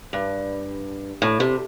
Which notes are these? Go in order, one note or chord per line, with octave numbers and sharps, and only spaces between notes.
G2
A2
C3